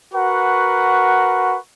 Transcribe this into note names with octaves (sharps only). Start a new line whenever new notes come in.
F#4 A#4 B4 F#5 C#6